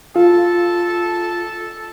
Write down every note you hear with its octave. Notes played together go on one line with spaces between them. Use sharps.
F4 A4